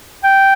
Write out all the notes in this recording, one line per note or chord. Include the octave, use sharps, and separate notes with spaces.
G5